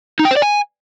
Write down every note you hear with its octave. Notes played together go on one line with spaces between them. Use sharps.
D#4
G5
C5
D5
G#5